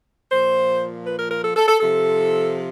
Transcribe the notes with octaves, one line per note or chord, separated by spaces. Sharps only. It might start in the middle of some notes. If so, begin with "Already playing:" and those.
A#2 F3 C5
B4
A#4
A#4
A4
A4
A4
C3 F3 A4